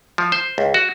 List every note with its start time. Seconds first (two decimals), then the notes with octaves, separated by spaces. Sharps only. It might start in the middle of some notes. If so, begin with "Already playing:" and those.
0.18 F3
0.32 C5
0.58 C#2
0.74 F#4